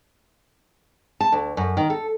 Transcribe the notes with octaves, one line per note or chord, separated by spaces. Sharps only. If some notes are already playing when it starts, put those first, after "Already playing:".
A5
D2
F#2
D#3
A4